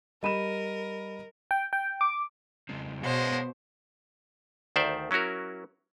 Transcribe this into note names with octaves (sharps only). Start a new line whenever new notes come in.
G3 A#4 D#5 B5 D#7 E7
G5
G5
D6
C#3 G#3 C4
B2 G#3 C5 C#5 F5 F#5
D2 D#3 C5 D5 E5
F#3 C#4 E4 F#4 A#4